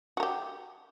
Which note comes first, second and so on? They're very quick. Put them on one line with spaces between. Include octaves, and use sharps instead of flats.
F#4 A#4 G4